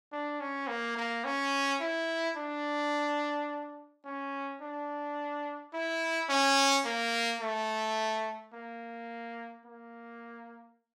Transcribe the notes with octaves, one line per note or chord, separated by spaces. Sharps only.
D4
C#4
A#3
A#3
C#4
E4
D4
C#4
D4
E4
C#4
A#3
A3
A#3
A#3